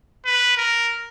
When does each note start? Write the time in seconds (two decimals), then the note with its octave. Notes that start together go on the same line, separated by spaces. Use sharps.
0.25 B4
0.57 A#4